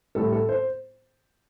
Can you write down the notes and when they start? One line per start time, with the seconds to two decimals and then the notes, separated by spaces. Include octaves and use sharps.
0.15 A2 G3 A4
0.33 A4
0.49 C5